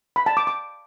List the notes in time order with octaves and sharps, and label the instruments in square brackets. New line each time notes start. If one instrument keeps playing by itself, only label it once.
[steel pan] B5
A5
D6
D6